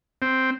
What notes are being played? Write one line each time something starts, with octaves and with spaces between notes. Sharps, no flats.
C4